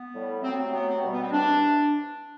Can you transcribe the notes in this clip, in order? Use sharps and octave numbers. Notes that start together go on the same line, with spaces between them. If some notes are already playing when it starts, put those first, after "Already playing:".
Already playing: B3
A2 G3
C3 F#3 A3 C4
B3
C4
C3 F#3 A3 B3
C4
B2 G3
B3
C4
C3 E3 G3 D4